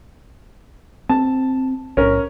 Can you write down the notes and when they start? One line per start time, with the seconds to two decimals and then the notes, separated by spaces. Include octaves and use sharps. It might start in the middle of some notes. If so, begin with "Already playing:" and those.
1.09 C4 A5
1.97 B1 A2 C#4 A#4